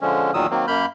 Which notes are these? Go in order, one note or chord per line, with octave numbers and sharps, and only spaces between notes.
D3 F3 G#3 C#4
E2 A#2 D#3 F#3 D#6 E6
D#3 F#3 A#3 C4
F#2 A#3 B5 F6 G6